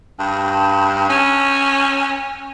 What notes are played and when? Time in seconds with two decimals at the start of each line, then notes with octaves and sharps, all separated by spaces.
0.19 G2
1.09 C#4